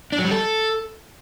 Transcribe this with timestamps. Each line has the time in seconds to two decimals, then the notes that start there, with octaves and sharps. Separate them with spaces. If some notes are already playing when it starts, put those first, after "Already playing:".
0.12 D4
0.19 F#3
0.25 G3
0.31 A4